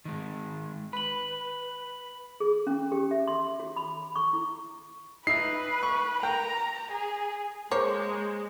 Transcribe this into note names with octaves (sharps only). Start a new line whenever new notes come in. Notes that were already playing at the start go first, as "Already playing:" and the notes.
D#3 G#3
B4 B5 F#7
G#4
C#4
G4
E5
C6
F#4
B5
C#6
E4
D#4 B4 E5 C7
C#6
A#4 G5 A#5
G#4
G#3 A#3 C5 C#5